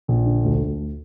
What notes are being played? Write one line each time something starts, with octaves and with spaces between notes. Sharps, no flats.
A#1
D3
D2
D2